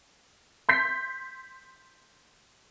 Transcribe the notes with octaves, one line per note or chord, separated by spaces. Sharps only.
C6 G6 B6